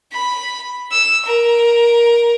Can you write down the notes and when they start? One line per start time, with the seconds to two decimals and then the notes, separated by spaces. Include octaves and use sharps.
0.12 B5
0.92 E6
1.25 A#4